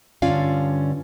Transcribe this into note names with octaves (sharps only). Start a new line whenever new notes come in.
G2 D3 C#4 F4 D5 F5